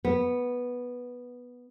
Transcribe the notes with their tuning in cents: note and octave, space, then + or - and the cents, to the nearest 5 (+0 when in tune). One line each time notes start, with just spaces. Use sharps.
B3 -5